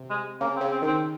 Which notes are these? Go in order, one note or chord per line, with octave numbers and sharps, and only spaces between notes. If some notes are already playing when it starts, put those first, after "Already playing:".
Already playing: C3
G#3
C#3 A#3
C4
C#3
C4
D#3 C4